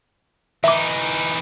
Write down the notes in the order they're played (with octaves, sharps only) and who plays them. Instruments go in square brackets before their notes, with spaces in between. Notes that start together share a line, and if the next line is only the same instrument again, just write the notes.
[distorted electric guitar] E3 D#4 [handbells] E5 D6